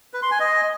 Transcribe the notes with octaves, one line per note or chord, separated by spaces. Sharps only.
B4
C6
G#5
D#5